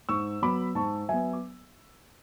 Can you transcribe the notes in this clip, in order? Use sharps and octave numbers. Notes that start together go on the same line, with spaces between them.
G#2 C#6 E6
F#3 B3 B5 D6
G#2 A5 C#6
F#3 B3 E5 G#5
D6